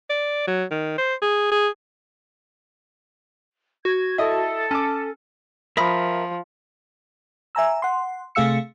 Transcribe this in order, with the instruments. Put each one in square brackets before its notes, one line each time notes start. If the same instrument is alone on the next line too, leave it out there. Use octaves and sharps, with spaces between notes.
[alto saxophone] D5
F#3
D#3
C5
G#4
G#4
[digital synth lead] F#4 [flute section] G#6
[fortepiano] E4 D#5 [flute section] A4
[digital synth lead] C#4 [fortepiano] A5 D6
[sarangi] F3 [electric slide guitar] A#4 E5 [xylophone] B5 D#6
[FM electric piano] E5 G#5 A#5 E6
F#5 C6
C3 A3 G#4 F5 E6 C#7